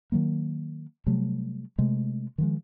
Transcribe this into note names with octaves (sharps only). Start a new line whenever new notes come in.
D#3 F#3 A#3
C3 F#3 G3 A3
C3 G#3 A3
D#3 F3 G#3